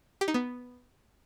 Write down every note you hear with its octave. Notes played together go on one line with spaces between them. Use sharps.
G4
D#4
B3